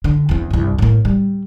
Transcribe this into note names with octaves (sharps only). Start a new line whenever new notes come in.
D3
E2 C4
C2 G2
A2 A#3
G3